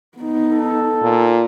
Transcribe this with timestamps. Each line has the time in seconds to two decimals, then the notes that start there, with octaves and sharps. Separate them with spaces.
0.18 B3 D#4
0.50 A4
1.02 A#2